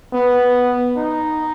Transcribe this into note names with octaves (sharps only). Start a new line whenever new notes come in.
B3
D#4